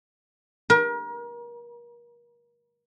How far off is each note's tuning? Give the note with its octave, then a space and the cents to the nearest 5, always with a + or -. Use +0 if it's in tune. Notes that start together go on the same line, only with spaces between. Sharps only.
A#4 +35